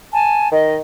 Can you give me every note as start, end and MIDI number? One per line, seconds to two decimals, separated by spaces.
0.14 0.48 80
0.14 0.48 81
0.51 0.79 51
0.51 0.77 75